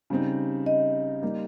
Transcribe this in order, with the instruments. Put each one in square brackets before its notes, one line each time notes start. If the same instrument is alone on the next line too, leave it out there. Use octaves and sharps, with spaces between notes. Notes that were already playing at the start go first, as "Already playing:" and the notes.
[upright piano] C#3 G3 C4 D#4
[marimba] D#5
[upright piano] G3 A#3 D#4